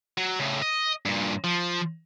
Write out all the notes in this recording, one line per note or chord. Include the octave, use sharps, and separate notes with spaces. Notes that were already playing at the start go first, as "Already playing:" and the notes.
F#3
A2 C#3
D#5
G2 A#2
F3